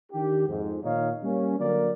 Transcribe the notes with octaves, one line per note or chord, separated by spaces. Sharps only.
D#3 D4 G4
F2 G#2
A#2 D#3 D#4 C#5 F5
G3 A#3 C#4
D3 F#3 A#3 A#4 D5